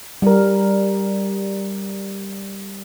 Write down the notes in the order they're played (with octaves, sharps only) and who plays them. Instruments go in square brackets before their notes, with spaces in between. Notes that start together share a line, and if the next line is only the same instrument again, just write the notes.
[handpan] G3 A#4